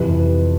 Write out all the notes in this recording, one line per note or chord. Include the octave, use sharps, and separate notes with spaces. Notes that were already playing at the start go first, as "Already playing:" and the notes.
Already playing: F2 C3 E3 B4